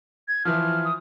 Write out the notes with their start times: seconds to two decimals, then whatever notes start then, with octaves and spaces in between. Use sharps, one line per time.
0.28 G#6
0.45 E3 F3 F6
0.85 D#6